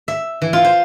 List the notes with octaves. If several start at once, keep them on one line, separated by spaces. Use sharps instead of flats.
E5
E3
F4
C5